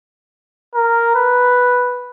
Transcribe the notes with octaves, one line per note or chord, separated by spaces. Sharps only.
A#4
B4